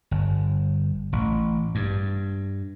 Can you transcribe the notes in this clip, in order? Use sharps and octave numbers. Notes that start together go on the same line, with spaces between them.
G1
A1
G2